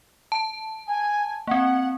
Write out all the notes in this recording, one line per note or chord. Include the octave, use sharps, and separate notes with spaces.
A5
G#5
A#3 C4 F#5